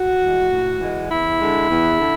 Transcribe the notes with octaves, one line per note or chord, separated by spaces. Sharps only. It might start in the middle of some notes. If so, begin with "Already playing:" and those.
Already playing: F#4
E3 G#3
A2
E3 G#3
E2 E4
D3 G#3
E2
D3